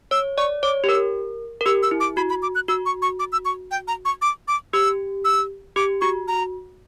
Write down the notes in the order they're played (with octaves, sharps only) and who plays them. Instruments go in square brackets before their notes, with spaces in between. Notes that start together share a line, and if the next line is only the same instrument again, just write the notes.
[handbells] C#5 [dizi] E6
[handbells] D5 [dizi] C#6
[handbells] C#5 [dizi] D6
[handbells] G4
[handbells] A#4 [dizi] E6
[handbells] A#4
[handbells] G4 [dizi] E6
[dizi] E6
[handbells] E4
[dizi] D6
[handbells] F#4 [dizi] B5
[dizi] B5
D6
F#6
[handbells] F#4 [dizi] E6
[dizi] C#6
C#6
D6
E6
C#6
G5
A#5
C#6
D6
D6
[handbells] G4 [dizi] E6
[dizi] E6
[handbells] G4 [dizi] D6
[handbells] F#4 [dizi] C#6
[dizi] A#5